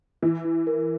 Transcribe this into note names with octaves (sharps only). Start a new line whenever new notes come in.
E3 E4
E4
A#4